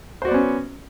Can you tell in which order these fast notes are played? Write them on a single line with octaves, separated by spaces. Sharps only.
C5 F#4 D5 B3 C#4